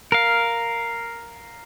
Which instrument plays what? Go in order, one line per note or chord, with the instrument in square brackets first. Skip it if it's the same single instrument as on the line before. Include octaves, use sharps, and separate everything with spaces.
[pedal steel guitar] A#4 F5